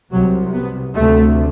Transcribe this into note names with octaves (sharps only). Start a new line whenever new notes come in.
C2 C3 F#3
B3
D2 C3 A3